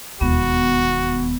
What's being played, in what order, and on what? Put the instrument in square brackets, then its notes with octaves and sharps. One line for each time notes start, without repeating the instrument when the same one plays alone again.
[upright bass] E1 D#2 [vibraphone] B3 [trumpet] F#4